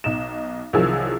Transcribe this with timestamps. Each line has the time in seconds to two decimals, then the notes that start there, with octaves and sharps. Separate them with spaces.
0.04 B1 D#4 E7
0.73 C2 D#3 F3 F#3 G#4 E6